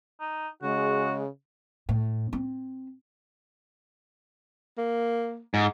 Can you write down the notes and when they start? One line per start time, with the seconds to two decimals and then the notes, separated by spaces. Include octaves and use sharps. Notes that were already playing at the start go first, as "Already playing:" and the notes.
0.20 D#4
0.62 C#3 G#3 F#4
1.89 A2
2.33 C4
4.78 A#3
5.54 G#2